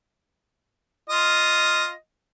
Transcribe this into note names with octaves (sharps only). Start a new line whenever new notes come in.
F4 D#5